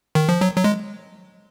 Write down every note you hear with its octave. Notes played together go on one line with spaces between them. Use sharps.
D#3
F3
F#3
F#3
G#3